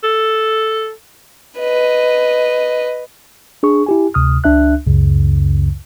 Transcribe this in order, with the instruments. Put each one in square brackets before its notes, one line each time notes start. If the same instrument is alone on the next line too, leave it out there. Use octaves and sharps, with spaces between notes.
[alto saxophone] A4
[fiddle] B4 D#5
[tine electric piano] D4 G#4 C#6
E4 G4 G#5
D2 C3 D#6 F6
C#2 D4 E5 F#6
C#2 F#2 C#3